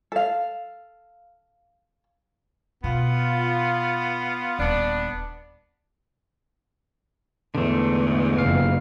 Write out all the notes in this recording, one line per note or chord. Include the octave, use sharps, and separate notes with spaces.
A4 F5
B2 B3 F4
D#1 B3 D4
E2 G#2 D3 A3
F#1 F2 F5